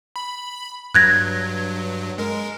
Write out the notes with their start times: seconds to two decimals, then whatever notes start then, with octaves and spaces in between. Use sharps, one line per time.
0.16 B5
0.94 G2 F#3 F#6 G#6 A#6
2.18 G#3 A#4